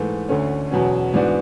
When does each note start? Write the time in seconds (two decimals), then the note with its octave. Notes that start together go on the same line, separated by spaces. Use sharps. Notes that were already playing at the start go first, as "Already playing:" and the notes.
Already playing: G#2 E3 A3
0.28 D2 D3 A3 C#4
0.71 E2 B2 F#3 C#4
1.14 G#2 E3 B3 D4 F#4